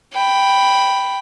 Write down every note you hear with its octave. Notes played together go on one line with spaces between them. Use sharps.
G5 B5